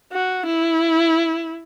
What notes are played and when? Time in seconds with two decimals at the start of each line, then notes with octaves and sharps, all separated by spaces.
0.12 F#4
0.46 E4